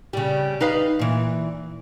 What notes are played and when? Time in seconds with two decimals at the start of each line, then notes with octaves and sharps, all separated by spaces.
0.13 C#3 G3
0.61 D#4 B4 F5
0.99 A#2 E3